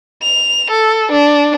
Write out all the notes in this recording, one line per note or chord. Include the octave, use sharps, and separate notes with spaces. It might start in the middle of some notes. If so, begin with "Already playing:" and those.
F7
A4
D4